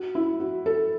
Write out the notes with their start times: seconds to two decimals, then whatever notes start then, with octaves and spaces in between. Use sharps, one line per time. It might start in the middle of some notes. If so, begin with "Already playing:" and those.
Already playing: F#4
0.15 E4
0.40 F#4
0.66 A4